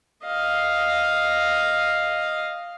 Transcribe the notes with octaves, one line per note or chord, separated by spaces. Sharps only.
D#5 F5